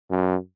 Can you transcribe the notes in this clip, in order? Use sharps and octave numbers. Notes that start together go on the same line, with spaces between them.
F#2